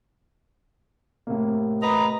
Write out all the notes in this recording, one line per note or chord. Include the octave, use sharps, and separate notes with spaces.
A2 C3 A#3
B4 D#5 A#5